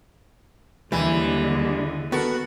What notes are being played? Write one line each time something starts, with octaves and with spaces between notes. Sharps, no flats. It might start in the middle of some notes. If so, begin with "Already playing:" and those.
D#2 D3 E3 G3 G#3 E4 G#4
B3 F#4 A4 A#4